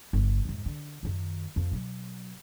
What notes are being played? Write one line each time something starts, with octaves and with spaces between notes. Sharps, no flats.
G1 C#3
F2 G#2
D3
F#2 D#3
F2
B2 F#3